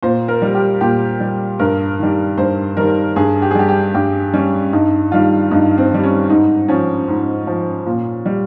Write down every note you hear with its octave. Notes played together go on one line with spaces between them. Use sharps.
A#2 C5
A#4
G3
G4
A#2 G4
G3
G2 A#4
D#3 G3
G2 C5
D#3 G3 A#4
G2 G#4
G4
G#4
G3 G4
G4
G2 G4
G3 C#4
G2 D#4
D#3 G3 F4
G2 D#4
C4
D#3 G3
C#4
G#2 D#4
F3 C#4
G#2
F3
A#2
G3